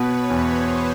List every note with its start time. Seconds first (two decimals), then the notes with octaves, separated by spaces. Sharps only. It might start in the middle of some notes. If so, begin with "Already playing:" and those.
Already playing: B2 B3 B4 C#5
0.30 E2 C5